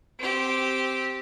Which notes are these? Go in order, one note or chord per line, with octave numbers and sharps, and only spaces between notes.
C4 G4